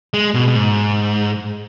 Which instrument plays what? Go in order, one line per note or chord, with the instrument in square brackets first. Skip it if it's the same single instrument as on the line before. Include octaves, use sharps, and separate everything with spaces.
[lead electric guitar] G#3
B2
B2
G#2